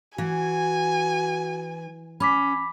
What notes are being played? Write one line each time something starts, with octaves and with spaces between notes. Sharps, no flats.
E3 F#4 G#5
C#4 B5 D6 B6